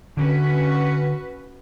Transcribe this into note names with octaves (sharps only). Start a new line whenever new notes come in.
D3 C#4 F#4 B4